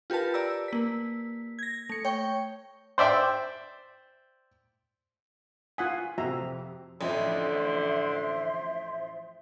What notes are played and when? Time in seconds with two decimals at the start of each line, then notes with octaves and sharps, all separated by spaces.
0.10 F4 G4 A#4 B4 A5
0.34 D5 A#5 E6
0.68 A#3 B6
1.59 G#6 A#6
1.89 A3 C#7
2.05 C#5 G5 C#6
2.98 C5 D5 E5 G5
5.78 F4 F#5 G#5 D#6 B6 C7
6.18 F2 C3 F#4 E5 A#5
7.01 A1 F2 D3 C5 E5 C6